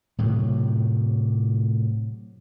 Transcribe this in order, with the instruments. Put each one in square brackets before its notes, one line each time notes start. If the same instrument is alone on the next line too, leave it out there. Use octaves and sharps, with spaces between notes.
[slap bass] A2 C3 F#3